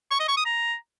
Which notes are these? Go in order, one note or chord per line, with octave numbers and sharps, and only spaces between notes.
C#6
D#5
C#6
D#6
A#5